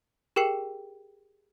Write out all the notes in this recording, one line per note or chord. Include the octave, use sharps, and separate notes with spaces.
G4 G#4 A#4 G5 C7